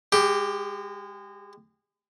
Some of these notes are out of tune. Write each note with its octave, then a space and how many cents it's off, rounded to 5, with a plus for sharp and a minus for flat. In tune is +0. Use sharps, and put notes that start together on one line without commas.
G#3 -30 G4 +0